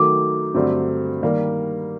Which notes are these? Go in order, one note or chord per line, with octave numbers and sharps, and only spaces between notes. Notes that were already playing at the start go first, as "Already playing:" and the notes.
Already playing: D#3 F#3 A3 D6
G2 D3 F#3 A3 C4
D#3 G3 A#3